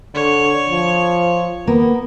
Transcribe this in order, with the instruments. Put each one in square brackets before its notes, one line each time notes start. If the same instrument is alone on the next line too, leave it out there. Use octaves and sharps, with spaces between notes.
[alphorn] D3 [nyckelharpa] C#5
[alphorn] F3
[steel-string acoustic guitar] A#3 [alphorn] B3